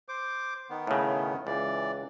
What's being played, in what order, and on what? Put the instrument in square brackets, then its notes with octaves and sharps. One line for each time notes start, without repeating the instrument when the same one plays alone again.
[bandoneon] C5 D6
D#3 B3
[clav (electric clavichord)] A2 C#3
[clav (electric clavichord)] C#2 [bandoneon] E3 D5